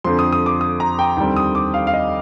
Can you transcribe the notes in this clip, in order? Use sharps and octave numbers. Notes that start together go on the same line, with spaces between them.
F2 D3 F3 C4 C6
D#6
D#6
D6
D#6
A#5
G5
D#2 D3 G3 C4 G5
D#6
D6
F5
F5
D#5